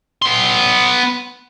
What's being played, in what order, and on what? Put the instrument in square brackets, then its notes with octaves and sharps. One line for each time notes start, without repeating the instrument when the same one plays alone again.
[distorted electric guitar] B3 C6